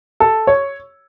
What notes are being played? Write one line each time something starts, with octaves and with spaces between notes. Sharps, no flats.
A4
C#5